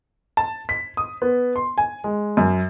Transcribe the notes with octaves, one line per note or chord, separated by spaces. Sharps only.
A5
B6
D#6
B3
C6
G#5
G#3
F#2